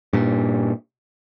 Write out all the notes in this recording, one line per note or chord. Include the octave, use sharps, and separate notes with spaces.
G2 A#2